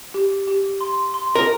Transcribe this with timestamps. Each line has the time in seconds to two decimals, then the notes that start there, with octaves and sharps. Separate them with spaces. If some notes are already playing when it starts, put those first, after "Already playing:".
0.14 G4
0.47 G4
0.81 C6
1.14 C6
1.35 A#4